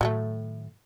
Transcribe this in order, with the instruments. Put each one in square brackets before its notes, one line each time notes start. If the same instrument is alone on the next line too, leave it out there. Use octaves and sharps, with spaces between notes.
[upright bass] A2 D#3 [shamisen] F#3 G3 A3